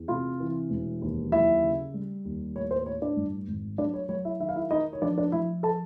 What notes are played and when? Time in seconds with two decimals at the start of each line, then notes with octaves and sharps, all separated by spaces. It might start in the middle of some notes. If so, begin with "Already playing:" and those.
Already playing: E2
0.08 C3 F4 F5
0.40 E3
0.70 E1
1.02 D#2
1.32 F#3 E4 E5
1.63 C#3
1.94 G3
2.25 D#2
2.55 A2 C#5
2.71 C5
2.86 A2 C#5
3.02 D4 D5
3.17 G2
3.47 G#1
3.78 F#3 D4 D5
3.94 C#5
4.09 F#3 C#5
4.25 E4 E5
4.40 D#3 E5
4.49 F5
4.56 E4 E5
4.71 D#3 D#4 D#5
4.93 C#5
5.02 F3 D4 D5
5.18 D4 D5
5.32 F3 E4 E5
5.63 A4 A5